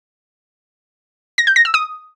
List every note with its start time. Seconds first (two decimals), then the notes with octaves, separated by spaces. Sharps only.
1.38 A#6
1.47 G6
1.56 A#6
1.65 E6
1.74 D#6